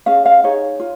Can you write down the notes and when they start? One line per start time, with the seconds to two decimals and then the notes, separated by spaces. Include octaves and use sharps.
0.06 C#4 G#4 F5
0.25 F5
0.44 D#4 G#4 C#5
0.80 F4